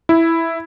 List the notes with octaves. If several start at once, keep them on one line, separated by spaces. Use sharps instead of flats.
E4